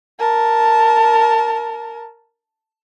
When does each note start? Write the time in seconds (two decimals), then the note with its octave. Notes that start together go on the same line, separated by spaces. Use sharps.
0.19 A#4 A5